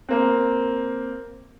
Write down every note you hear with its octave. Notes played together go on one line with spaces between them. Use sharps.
A#3 C4